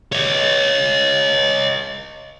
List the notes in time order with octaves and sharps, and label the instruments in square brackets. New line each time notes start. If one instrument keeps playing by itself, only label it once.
[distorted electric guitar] C#5 D#5